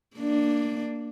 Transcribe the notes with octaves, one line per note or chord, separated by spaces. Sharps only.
A#3 D4